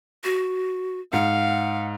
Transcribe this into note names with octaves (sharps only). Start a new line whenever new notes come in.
F#4
G#2 F5 F#5